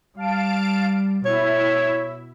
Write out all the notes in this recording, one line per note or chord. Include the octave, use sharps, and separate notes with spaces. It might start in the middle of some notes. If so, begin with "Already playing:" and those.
G3 F5 A5 D7
B2 E4 C#5 E5